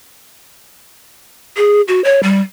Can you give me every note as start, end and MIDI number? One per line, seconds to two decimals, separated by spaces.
1.57 1.81 68
1.88 2.03 66
2.04 2.20 73
2.23 2.41 55